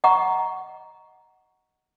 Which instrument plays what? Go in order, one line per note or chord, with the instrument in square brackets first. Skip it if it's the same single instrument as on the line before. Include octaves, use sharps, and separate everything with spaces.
[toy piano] D#5 F#5 A#5 C#6